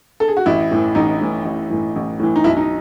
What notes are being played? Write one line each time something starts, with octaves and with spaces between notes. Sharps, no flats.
A4
G#4
F#4
A1 E4
A2 E3
A1 D#4
A2 E3
A1
A2 E3
A1
A2 E3
D#4
B1 E4
D#4